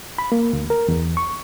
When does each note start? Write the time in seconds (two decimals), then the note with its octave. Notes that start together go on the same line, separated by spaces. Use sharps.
0.18 B5
0.32 A#3
0.53 D2
0.70 A#4
0.88 E2
1.17 C#6